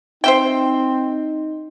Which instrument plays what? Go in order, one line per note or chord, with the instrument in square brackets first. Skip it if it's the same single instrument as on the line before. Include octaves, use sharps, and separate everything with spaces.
[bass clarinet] C4 [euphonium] D#4 [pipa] C5 E5 G5